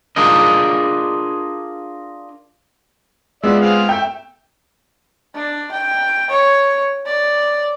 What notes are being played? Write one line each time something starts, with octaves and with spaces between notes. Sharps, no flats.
D4 F4 G#4 A#4 D#5
G#3 B3 F4 D5 E5
C4 G#4 F5
A3 E5 G5
D4
G5
C#5
D5